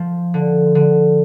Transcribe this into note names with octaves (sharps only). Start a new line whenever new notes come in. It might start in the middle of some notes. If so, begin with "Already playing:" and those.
Already playing: F3
D3
D3